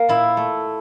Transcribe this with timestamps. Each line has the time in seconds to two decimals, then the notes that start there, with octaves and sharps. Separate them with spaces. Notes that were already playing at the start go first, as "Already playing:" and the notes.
Already playing: A#3
0.09 A#2 E4
0.37 A3